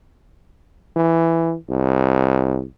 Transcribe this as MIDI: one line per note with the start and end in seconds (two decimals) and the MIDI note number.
0.96 1.55 52
1.70 2.63 36